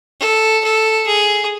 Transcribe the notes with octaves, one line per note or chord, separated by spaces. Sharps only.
A4
A4
G#4